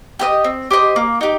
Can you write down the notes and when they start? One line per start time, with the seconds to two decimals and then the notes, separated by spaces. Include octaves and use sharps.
0.19 G4 C5 D#5
0.44 C4
0.70 G4 C5 D#5
0.96 A#3
1.21 D#4 G4